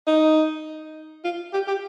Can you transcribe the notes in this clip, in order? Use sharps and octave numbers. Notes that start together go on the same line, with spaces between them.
D#4
F4
G4
G4